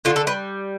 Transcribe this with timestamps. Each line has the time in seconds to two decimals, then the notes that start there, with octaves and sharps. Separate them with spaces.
0.05 D3 F4
0.16 A4
0.27 G3 B4